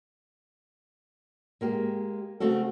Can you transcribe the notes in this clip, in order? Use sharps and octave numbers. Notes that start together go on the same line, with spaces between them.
G#3 A#3 G4
C#3 A3 C4 F#4 A4